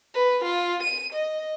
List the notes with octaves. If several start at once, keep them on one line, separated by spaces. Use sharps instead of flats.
B4
F4
D#7
D#5